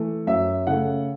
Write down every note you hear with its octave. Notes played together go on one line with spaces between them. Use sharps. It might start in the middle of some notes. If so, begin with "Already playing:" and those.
Already playing: E3 A3
F#2 E5
C#3 A3 F#5